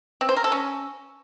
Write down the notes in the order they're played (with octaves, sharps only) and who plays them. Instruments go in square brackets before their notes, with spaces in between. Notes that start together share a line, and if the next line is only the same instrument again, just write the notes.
[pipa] C4
C5
A#4
A4
C#4